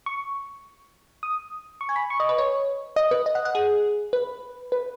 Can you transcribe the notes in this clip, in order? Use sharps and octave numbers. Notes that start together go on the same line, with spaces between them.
C#6
D#6
C#6
G#5
B5
C#6
D#5
B4
C#5
D#5
B4
D#5
F#5
F#5
G#4
B4
B4